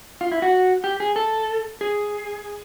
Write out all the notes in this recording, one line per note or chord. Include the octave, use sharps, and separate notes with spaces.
F4
E4
F#4
G4
G#4
A4
G#4